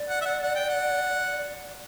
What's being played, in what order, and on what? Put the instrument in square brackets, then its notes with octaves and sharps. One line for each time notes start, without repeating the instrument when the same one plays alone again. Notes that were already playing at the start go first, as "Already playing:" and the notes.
Already playing: [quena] D5
[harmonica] F#5
E5
F#5
F#5
G5
F#5